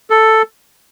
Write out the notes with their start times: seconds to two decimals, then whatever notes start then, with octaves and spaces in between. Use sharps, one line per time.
0.10 A4